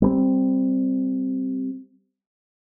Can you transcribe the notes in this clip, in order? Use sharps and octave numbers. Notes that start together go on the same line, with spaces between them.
G3 B3 C4